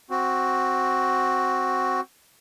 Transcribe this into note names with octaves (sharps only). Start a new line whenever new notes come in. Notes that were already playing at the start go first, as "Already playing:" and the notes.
C4 F#4